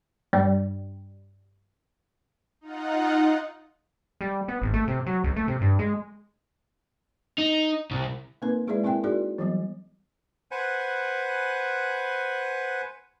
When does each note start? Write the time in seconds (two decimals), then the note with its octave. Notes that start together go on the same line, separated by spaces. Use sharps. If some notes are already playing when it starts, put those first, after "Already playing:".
0.33 G2 G3
2.61 D#4 F4 F#5
4.21 G3
4.48 B3
4.62 G#1
4.74 A3
4.88 C3
5.06 F#3
5.24 C#2
5.36 A3
5.48 C3
5.61 G2
5.79 G#3
7.38 D#4
7.91 C2
8.42 A#3 C4 D#4 A#4 B4
8.67 G#3 E4 G#4 B4 D5 E5
8.84 C4 E4 A#4 E5 G5
9.04 D#4 E4 F#4 G#4 A#4 D5
9.38 E3 F#3 G3 B3
10.51 B4 C5 F#5 G#5